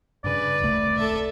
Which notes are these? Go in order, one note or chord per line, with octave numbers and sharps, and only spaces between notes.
G2 C#3 B4 D5
D#1 C2 A3
A4 E5